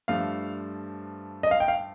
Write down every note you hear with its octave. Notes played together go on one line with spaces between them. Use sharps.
G2 F3 A3 F5
D#5
F5
G5
F5